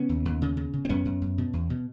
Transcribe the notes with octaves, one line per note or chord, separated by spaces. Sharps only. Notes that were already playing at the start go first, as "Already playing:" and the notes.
Already playing: C#3 B3 C#4
D#2
D#2
C#3
C#3
C#3
C4
F#2 B3 C#4
F#2
F#2
B2
E2
B2